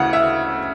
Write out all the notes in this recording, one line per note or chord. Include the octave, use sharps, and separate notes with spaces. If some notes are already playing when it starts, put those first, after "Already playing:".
Already playing: D2 C#3 E3 F#5
E5